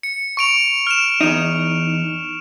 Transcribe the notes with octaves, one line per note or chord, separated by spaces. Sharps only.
C#7
C#6 D7 F7
F6 E7
E2 D#4